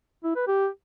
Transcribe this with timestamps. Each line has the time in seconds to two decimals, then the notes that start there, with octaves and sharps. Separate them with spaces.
0.24 E4
0.36 B4
0.48 G4